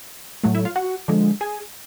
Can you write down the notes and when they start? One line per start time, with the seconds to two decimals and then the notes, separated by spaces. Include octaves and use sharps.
0.44 A2 F#3 A3
0.55 E4 E5
0.65 F4 F5
0.76 F#4 F#5
1.08 D3 F3 G#3
1.41 G#4 G#5